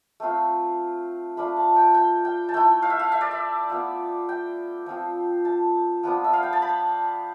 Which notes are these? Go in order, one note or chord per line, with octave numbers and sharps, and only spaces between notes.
A3 C4 F4
A3 D4 F4 B5
A5
G5
G5
G5
A5
A3 E4 G5
F5
E5
F5
E5
D5
E5
B3 F4
G5
F3 C4 F4
A5
F3 B3 D4
E5
F5
G5
A5
B5